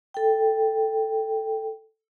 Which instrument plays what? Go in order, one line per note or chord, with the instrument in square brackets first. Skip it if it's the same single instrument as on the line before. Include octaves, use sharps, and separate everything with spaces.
[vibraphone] A4 G5